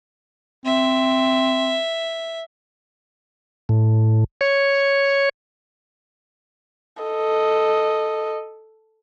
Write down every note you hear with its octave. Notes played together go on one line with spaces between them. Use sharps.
C4 E5
A2
C#5
A4 D#5